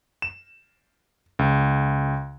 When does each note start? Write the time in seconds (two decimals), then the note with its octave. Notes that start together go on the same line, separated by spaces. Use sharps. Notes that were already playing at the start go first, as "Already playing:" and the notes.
0.22 E7
1.39 C#2